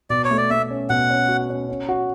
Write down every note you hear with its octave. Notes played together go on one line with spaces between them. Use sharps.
B2 D5
C#5
A3
D5
A3 E5
C#4
B2 F#5
C#4
F#4
C#4
C#4
F#4